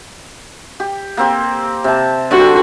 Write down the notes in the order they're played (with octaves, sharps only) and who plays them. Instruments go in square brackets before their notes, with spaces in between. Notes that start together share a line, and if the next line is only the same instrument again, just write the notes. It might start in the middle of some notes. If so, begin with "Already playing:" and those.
[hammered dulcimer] G4
A#3 C4 G4
C3 A5
[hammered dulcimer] D3 G3 C4 [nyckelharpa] F#4